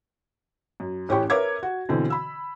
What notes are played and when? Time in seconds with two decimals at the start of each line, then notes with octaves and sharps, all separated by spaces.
0.80 F#2
1.09 A1 C#4 E4 G4 G5 C#6
1.30 A#4 B4 C#5 E5 D6 G#6
1.63 F#4
1.89 B2 D3 E3 C4
2.10 B5 E6